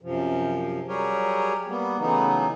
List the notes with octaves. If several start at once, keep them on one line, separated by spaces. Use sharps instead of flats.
F#2 C3 F3
F#3 G3 G4 G#4 A#4 C#5
G3 A#3 B3
C#3 E3 F#3 A3 B3 D#4